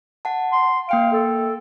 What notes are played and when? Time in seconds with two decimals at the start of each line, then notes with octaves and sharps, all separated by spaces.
0.25 F#5 A5
0.52 C6
0.89 A#3 F5 G5 D7
1.12 A4